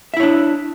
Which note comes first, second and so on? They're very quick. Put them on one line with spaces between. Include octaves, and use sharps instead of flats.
E5 E4 C#5 D4